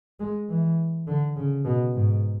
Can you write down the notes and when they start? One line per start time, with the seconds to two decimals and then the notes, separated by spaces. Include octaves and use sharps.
0.20 G#3
0.49 E3
1.07 D3
1.36 C#3
1.65 B2
1.94 G#2